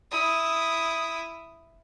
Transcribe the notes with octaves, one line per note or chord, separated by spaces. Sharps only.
E4 D#6